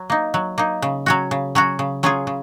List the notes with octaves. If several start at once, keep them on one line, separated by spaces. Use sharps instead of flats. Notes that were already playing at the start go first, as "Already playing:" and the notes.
Already playing: F#3
A#3 D#4
F#3
A#3 D#4
C#3
F#3 C#4 F#4
C#3
F#3 C#4 F#4
C#3
F#3 C#4 F4 G#4
C#3